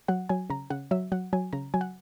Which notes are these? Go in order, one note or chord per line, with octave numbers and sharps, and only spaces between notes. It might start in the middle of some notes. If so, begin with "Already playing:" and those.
F#3 F#5
F#3 G#5
C#3 A#5
C#3 F#5
F#3 E5
F#3 F#5
F#3 G#5
C#3 A#5
F#3 G#5
F#5